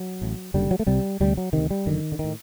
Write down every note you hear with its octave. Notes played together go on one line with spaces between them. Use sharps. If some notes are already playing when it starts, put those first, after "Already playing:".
Already playing: F#3
A1 A2
F#1 F#2 D3 G3
F#3
A3
C2 C3 G3
D2 C3 G3
F#3
D2 C3 D#3
G3
F#1 F#2 D3 D#3
D3
A2 D#3